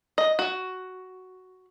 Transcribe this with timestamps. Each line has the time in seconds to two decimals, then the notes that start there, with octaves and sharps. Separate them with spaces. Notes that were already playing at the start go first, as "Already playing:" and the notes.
0.18 D#5
0.39 F#4